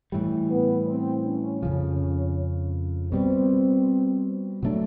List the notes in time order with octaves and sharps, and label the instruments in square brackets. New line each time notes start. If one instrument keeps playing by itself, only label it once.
[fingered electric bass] A2 E3 G3
[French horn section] B3
C4
C#4
[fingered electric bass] F2 C#3 F3
[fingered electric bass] B2 G3 B3 [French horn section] C4
[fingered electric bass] B2 F#3 A3 D4